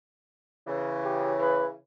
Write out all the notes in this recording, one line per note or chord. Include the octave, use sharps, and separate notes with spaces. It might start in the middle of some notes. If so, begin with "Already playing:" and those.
C#3 E3
G4
B4